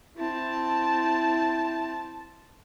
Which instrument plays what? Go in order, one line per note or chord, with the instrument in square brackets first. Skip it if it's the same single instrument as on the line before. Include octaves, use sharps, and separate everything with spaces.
[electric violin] C4 A5 [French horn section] E4